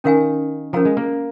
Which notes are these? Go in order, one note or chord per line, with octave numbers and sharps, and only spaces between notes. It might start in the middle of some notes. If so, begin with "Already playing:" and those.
D#3 C#4 A#4 F5 G#5
F3 C#4 A#4 F5 A#5
G#3
A#3